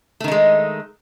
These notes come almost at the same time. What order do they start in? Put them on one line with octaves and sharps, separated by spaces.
A3 D#3 D#4 G#3